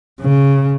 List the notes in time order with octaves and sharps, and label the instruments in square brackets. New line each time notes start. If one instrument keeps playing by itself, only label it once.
[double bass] C#3